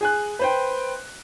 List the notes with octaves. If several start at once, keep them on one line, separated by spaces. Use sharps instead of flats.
G#4 G#5 F#6
B4 C5 G5